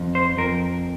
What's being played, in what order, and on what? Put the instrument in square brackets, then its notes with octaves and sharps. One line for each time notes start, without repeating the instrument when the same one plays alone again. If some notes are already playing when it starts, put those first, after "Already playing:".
Already playing: [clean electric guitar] F2
C5
F2 A#4